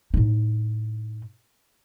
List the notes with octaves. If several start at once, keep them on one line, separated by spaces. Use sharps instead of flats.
A2 D#4